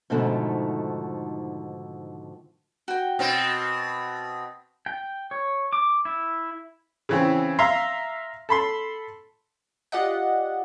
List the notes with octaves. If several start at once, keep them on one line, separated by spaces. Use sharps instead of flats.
G#2 B2 D3 D#3 F3 A3
F#4 G5
B2 C4
G5
C#5
D6
E4
C#3 E3 C4
E5 F5 A#5 C6
A4 B5 C6
F4 G4 D5 D#5 F#5